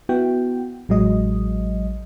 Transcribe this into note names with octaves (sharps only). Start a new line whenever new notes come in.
B3 E4 F#4 G5
A1 F#3 G#3 D#5